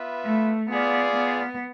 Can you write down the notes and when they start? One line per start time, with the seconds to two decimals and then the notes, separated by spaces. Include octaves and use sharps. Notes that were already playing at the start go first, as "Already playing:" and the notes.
Already playing: B3 F4 B4 E5
0.25 A3
0.71 B3 F4 G#4 D5 F5
1.17 B3